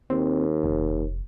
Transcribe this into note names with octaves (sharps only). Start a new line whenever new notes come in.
D#2 C4
F1